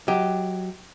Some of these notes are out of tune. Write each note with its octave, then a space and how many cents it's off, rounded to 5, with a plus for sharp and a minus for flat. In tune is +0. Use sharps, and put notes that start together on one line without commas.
F#3 +0 G4 +0 D#5 +30